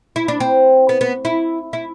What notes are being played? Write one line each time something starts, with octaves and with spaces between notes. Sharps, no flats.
E4
D4
C4
B3
B3
E4
E4